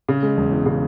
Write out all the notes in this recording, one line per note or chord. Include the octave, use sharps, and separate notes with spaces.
C#3
G#3
E1
E2
C#3